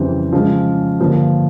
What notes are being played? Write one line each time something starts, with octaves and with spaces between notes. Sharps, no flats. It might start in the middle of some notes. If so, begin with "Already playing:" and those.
Already playing: F2 C#3 E3 G3 C4
C#3 F3 G#3
G2 D3 F3 A#3